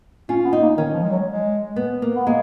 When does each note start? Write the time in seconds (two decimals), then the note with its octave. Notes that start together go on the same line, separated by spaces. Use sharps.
0.29 C#4 F4
0.45 B3
0.53 D#4
0.62 A#3
0.77 D#3 C#4
0.94 F3
1.03 G#3
1.11 F#3
1.28 G#3
1.76 B3
2.02 A#3
2.15 B3
2.26 G#3 A#3